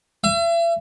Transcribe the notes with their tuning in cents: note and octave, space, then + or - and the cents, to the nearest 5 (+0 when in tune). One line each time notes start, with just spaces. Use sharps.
E5 +40